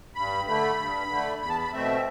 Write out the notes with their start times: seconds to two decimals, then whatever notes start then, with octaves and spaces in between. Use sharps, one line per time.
0.15 G2 B5
0.46 D3 A3 B5
0.78 G2
1.10 D3 A3
1.41 E2 B5
1.50 A5
1.58 B5
1.73 B2 A3 C4 E5